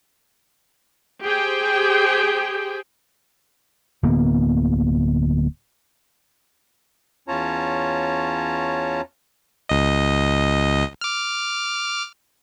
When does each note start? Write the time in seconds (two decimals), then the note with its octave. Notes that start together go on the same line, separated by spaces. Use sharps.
1.23 G4 G#4 C5 G5
4.03 D1 D2 A#3 B3
7.28 E2 C#4 F4 C#5 A5 A#5
9.69 C#2 D#5
11.01 D6 F6